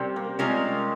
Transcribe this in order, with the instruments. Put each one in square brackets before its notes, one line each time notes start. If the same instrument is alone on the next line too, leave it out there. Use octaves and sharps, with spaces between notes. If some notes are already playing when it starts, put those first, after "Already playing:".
Already playing: [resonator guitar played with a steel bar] C3 G3 C#4 A#4 [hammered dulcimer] C4
[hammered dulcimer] A#3
[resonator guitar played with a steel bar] C3 G3 C#4 F4 A#4 [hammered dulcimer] G#3